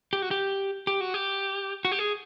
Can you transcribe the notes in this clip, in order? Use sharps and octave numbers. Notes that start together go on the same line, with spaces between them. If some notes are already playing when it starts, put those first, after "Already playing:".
G4
F#4
G4
G4
F#4
G4
F#4
G4
G#4